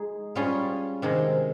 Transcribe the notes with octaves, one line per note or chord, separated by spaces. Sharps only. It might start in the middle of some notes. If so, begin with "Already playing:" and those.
Already playing: G#3 D#4 G#4
G3 C#4 F4 G#4
C3 D#3 G#3